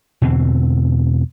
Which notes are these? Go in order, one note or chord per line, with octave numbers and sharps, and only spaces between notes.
E2 B2 D3 C4